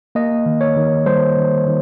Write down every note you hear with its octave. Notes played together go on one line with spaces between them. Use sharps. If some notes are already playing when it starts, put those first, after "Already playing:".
A#3 D#5
D#3
C#5
D#3
G3 C5
D#3
D#3